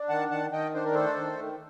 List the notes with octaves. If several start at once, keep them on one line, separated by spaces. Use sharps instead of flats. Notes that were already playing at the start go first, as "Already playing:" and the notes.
Already playing: D4
D#3 F#5 A5
D#3 F#5 A5
D#3 D#5 G5
D4 C5
A#4
A3 A4 C5
D#3
D#3